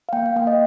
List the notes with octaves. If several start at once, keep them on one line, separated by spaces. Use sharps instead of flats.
F5
A#3 G5
F5
A#3 G5
D#5